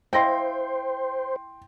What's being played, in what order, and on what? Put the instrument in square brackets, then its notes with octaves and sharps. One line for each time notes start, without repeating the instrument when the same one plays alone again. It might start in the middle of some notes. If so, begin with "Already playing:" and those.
[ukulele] E4 D#5 F5 [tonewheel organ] C5 [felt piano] G5 C6